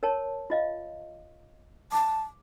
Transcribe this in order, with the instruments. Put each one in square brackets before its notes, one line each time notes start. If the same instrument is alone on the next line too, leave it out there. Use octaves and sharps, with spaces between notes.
[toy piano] A#4 C#5 A5
F4 D#5 F5
[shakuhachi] A5 [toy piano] D6